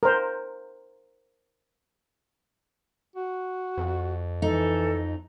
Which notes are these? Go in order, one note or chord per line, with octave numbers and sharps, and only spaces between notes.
A#4 C5
F#4
F2
E3 D#4 A4